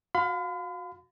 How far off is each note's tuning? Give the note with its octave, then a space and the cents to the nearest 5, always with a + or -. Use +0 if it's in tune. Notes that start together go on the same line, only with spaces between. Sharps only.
F#4 -20 F5 +15 B5 +45